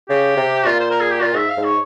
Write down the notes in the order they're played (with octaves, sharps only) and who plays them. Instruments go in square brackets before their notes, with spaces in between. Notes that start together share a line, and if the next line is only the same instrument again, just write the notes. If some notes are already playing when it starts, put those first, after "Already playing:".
[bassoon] C#3 [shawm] G4
[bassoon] C3
[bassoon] A#2 [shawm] F4
[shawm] C5
A#4
G#4
G4
[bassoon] A#2 [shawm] F4
[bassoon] G#2 [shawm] E5
[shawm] F5
[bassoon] G#2
[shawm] C#5